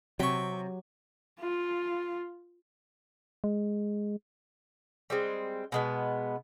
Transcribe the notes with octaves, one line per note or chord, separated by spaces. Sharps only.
C3 F#3 G5 C#6
F4
G#3
G3 G#3 C4
B2 G#3 B3